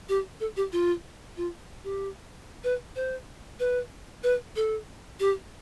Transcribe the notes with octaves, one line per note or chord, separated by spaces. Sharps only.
G4
A4
G4
F4
F4
G4
B4
C5
B4
B4
A4
G4